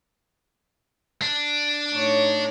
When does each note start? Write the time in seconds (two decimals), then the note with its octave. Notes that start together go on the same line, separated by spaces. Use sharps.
1.22 D4
1.93 A2 D#4 C#5